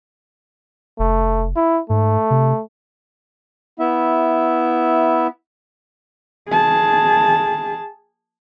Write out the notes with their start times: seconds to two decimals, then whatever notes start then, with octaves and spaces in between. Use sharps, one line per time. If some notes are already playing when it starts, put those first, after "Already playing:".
0.99 F1 A3
1.56 E4
1.90 G#2 A3
2.30 C3
3.80 B3 E4 E5
6.49 G#4 A5